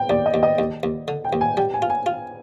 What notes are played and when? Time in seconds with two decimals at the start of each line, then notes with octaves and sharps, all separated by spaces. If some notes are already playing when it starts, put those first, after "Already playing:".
Already playing: G5
0.10 D#2 D5
0.26 D#5
0.34 D#2
0.43 D#5
0.59 D#2
0.83 D#2
1.08 D3
1.24 G5
1.33 D#2
1.41 G#5
1.57 G3 G5
1.74 G#5
1.82 F4
1.90 G#5
2.06 F4